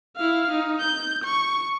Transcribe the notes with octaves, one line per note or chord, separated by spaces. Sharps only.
E4 F5
D#4
G6
C#6